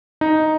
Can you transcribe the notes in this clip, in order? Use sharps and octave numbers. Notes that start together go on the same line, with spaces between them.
D#4